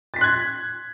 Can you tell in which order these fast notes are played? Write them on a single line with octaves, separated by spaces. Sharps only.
A6 B6 C6 F#6 G#6